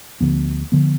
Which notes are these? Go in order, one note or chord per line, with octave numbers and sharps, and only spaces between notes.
D2 D3 F3 B3
D3 F3 B3